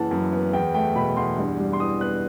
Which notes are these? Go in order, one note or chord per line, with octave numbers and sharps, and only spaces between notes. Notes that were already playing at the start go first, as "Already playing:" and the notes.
Already playing: F#1 E3 F#5 A5
F#2
B3
E2 G5
A3 G5
B2 B5
E2 C6
G2
G3
C6
E3 D#6
B3 F#6